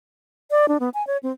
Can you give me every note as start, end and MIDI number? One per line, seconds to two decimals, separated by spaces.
0.51 0.66 74
0.68 0.78 62
0.80 0.89 59
0.94 1.05 80
1.07 1.17 73
1.23 1.32 60